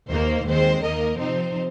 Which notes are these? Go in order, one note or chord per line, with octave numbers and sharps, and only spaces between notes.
D#2 D#3 A#3 C5
D#2 D#3 G#3 C4 C5
D#2 D#3 A#3 A#4 D#5
C3 F3 C4 D#4 C5